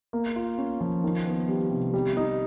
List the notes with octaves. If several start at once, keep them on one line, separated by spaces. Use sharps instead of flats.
A#3
F4
C#4
F3
D#3
B3
G3
C3
G3
D#4